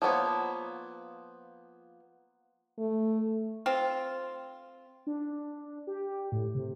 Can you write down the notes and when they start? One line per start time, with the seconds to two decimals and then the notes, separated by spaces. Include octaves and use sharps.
0.02 F3 A#3 B3 C#5
2.78 A3
3.66 C4 F4
5.07 D4
5.87 G4
6.32 A2
6.55 C3